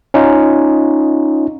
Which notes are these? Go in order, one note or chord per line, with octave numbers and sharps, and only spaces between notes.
C#4 D#4 F4